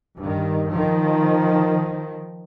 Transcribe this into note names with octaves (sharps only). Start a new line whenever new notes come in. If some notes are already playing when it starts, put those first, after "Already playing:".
G2 D#3
D#3 F3